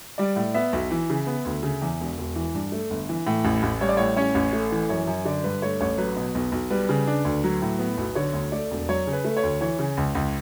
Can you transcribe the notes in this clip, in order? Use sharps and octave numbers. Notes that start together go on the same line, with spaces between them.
G3 D5
A2
B3 E5
B1
E3
C#3
B3
D2
C#3
E2
E1
E1
E3
G2
A3
G1
E3
A2
A1
A1
G3 C#5
D5
A2 C#5
C#4 C#5
A1
A3
E3
F#2 C#5
F#2
D3 D5
G2 B4
A3 C#5
A1 C#5
F#3 B4
B2
B1
B1
G3 B4
C#3
D4
D2
F#3
A2
B3
B1
D3 C#5
D2
A3 D5
E1
F#3 C#5
C#3
B4
A3
C#5
D2
E3 C#5
C#3
C#2
C#2